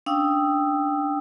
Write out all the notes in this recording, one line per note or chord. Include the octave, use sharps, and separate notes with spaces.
C#4 D4 F5 G5 D#6 E6